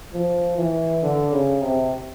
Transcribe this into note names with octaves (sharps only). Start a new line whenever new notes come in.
F3
E3
D3
C#3
C3